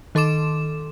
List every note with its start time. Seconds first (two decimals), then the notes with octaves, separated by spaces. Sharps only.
0.15 D#3 A4 C6 D6 E7